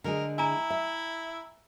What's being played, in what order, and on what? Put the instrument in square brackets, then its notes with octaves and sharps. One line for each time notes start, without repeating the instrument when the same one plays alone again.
[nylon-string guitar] D3 G#3 G#4 [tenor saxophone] A#4
[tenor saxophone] E4 [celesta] G#5 A#5
[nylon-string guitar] E5